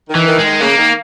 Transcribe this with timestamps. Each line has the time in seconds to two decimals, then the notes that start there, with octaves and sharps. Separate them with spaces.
0.10 D#3
0.15 E3
0.27 D#3
0.39 G#3
0.44 D#3
0.61 C#3 A#3
0.78 D#3